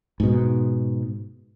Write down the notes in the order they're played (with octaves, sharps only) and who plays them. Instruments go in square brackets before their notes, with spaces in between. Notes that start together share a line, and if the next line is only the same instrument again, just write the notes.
[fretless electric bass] G#2 B2